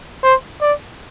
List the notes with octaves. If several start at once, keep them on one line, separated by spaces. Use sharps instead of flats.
C5
D5